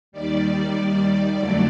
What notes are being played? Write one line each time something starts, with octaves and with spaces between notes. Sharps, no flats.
D#2 D#3 G3 D5
F2 D3 F#3 A3 D5